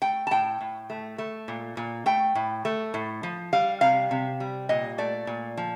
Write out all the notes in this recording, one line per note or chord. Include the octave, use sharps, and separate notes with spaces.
A3 G5
A5
A2 G5
A2
A3
A3
A#2
A#2
A3 G5
A2
A3
A2
F3
G3 F5
C3 F5
C3
G3
A#2 D#5
A3 D5
A#2
F3